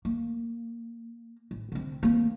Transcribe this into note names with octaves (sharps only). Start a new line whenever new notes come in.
A#3
A1
D3 C4
A#3 C4